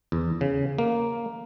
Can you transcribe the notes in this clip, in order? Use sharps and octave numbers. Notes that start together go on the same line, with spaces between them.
E2
C#3
A#3